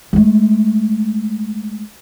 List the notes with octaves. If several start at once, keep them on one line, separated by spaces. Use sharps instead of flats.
G#3 A3